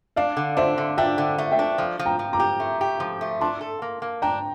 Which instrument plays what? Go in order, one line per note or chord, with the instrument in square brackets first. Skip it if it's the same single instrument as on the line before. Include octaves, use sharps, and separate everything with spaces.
[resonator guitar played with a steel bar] D4 [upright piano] D5 F5
[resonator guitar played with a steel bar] D3
[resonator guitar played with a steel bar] D4 [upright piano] C5 E5
[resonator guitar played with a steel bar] D3
[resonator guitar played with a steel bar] D4 [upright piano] E5 G5
[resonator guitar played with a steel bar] D3
A3
[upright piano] E5 G5
[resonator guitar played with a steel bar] D4
F3
F3
[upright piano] G5 A#5
[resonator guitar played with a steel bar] F3
[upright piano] A#5 D6
[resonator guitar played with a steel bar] G4
A3
G4
F3
A3
[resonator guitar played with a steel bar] D4 [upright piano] A5 C6
[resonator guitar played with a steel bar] A4
A#3
A#3
[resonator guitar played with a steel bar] D4 [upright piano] G5 A#5